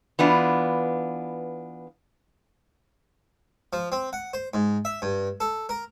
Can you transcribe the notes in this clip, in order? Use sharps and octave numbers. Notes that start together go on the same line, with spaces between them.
E3 B3 D4 F4
F3
C4
F#5
C5
G#2
E5
G2
A4
A#4